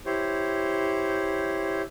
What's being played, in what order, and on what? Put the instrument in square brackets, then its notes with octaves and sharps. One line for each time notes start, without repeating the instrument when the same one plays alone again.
[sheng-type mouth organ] E4 G4 C5 C#5